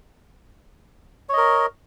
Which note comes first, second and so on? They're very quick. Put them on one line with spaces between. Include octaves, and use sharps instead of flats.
C#5 D#5 A#4